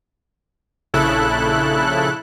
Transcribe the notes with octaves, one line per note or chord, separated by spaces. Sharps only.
A#1 C#3 E4 A4 F#6